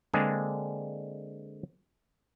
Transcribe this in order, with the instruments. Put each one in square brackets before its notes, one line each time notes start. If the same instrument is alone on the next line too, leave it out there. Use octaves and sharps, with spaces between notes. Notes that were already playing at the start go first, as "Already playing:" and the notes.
[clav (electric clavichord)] D3 G#3 A#3 C4 D4 G#4